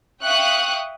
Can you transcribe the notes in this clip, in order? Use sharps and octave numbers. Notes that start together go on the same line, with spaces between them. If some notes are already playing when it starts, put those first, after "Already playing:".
E5 F5 G5 C#6 D#6 F#6